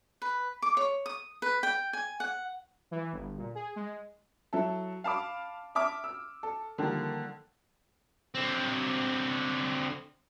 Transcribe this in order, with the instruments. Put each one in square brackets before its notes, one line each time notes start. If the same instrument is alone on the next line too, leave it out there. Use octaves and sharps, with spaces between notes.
[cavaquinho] B4
D6
C#5
D#6
B4
G5
G#5
F#5
[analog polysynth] E3
G1
A#2
G#4
G#3
[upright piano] F#3 E4 A4
F5 A5 B5 D6
E5 A5 D6 F6
E6
A4
D3 D#3 F3 G3 A#3
[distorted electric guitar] D3 C4